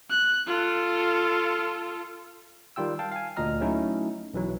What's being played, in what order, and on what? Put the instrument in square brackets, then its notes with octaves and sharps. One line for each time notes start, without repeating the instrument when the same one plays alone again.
[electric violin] F#6
F4 A4
[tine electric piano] D#3 G3 F4 G5 E6
F5 G5 A5
F5 G#5
D2 A#2 D#5 A#5 F6
F#3 A3 C#4 D#4 E4
B1 E3 F#3